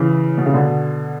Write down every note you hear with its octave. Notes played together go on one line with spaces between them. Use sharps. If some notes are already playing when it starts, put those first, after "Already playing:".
Already playing: C#3 E3
B2
C#3
B2 D3